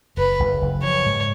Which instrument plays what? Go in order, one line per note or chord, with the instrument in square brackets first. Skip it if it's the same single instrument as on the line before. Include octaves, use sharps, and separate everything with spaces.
[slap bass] F#1 [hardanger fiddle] B4
[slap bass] F#1
F#1
[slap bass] F3 [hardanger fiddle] C#5
[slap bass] G#2